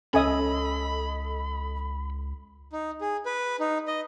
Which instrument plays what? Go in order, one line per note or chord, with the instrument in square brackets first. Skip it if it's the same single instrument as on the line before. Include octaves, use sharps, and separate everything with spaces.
[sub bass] C#2 [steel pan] C#4 G#5 D#6 [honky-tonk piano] A4 D#5 E6 [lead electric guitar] B5
[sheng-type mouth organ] D#4
G#4
B4
D#4
D#5